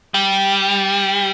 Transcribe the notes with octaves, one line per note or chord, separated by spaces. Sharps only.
G3